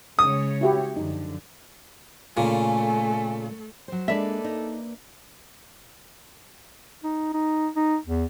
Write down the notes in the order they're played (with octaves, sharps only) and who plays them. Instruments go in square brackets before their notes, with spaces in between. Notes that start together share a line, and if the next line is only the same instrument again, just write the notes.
[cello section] C#3 G#3 C#5 [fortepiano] D#6
[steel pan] E4 F#4 G4
[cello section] F#2 D3 F3 [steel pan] D#4
[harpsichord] A#2 C#3 [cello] A3 A4 [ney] G#5
[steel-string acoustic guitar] F#3 C5
[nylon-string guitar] G#3 D4 [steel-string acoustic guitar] A#3 B4 D5 [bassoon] A4 [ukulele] E5
[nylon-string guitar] D#4
[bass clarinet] D#4
D#4
D#4
E2